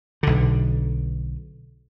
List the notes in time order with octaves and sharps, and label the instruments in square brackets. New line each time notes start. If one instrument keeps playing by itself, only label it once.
[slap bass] B1 D3